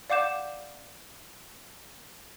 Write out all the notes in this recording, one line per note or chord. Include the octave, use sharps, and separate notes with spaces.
D5 F5 F#5 D6 G6 E7